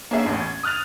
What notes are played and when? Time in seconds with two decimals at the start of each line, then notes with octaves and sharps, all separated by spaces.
0.11 A#3 B3 C#4 D4 G#4 E5
0.26 A1 E2
0.40 G#6
0.63 D#6 F6 F#6 A6 F7